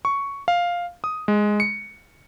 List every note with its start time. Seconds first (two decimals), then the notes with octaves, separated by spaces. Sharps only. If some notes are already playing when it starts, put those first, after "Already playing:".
0.05 C#6
0.48 F5
1.04 D#6
1.28 G#3
1.60 C#7